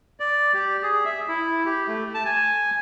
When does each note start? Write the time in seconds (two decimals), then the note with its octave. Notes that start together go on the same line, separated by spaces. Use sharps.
0.20 D5
0.54 G4
0.83 G#4
1.05 E5
1.29 E4
1.65 G4
1.88 A3
2.14 A5
2.25 G#5